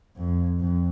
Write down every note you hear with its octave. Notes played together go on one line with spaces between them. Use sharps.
F2
F2